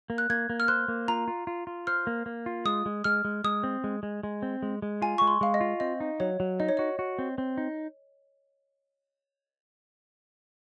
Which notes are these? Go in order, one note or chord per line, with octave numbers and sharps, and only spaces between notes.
A#3
F#6
A#3 G#6
A#3
F6
C5 F#6
A#3
F4 A#5
F4
F4
F4
C5 F6
A#3
A#3
F4
G#3 D#6
G#3
G#3 F6
G#3
G#3 D#6
C4
G#3
G#3
G#3
C4
G#3
G#3
F4 G#5
G#3 C#6
C6
G#3 F5
D#5
F4
C4 D#5
D#4
F#3 C#5
F#3
D#4 D#5
C#5
F#4 D#5
F#4
C4
C4
D#4